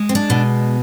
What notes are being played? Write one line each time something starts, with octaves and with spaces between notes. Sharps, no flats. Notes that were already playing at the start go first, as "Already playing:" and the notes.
Already playing: G#3
C4
D4
B2